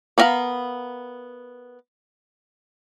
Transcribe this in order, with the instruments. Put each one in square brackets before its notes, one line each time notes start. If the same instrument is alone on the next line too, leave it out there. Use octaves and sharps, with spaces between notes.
[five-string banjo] B3 D4 A#4 F5 B5